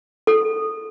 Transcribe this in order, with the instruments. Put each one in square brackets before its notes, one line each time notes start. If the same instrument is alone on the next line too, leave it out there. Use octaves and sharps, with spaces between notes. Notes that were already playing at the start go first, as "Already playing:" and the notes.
[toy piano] A4